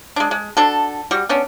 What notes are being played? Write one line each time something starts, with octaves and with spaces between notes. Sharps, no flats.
G#3 D4
G#3
D4 F#4 A4
G3 F#4
B3 C#4 D4